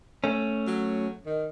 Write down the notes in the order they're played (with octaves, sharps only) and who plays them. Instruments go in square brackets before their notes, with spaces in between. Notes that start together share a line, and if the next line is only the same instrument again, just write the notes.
[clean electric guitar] A3 C#4
[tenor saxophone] F#3
D#3